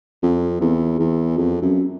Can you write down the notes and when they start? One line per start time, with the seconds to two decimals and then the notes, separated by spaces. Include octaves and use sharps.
0.23 F2
0.61 E2
0.99 E2
1.37 F2
1.62 F#2